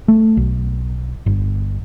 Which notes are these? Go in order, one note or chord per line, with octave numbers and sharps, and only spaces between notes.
A3
B1
G1